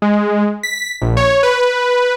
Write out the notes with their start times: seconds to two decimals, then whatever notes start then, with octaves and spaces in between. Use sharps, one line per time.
0.02 G#3
0.63 B6
1.02 A#1
1.17 C#5
1.43 B4